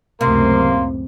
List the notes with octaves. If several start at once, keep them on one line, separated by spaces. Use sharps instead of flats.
C#2 F#2 A2 C3 A#3 C6